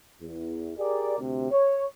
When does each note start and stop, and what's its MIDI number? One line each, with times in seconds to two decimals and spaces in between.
0.22 0.72 40
0.77 1.16 67
0.77 1.16 68
0.77 1.16 70
0.77 1.16 74
1.19 1.50 38
1.19 1.50 48
1.51 1.85 73